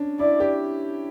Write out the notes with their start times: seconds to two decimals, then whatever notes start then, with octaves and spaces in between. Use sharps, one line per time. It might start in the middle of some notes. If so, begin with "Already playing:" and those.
Already playing: C#4 D4
0.19 E4 D5
0.40 G4